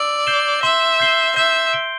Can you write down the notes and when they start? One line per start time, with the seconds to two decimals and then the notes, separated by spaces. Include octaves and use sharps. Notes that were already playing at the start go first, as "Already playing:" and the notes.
Already playing: D5 E6
0.27 G6 C7 E7 G7
0.63 E5 C6
1.00 G6 C7 G7
1.36 E5 G6
1.73 D7 G7